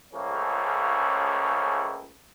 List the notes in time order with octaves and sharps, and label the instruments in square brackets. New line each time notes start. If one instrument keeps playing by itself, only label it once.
[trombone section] C#2 C#3 F3 A3 A#3 C#4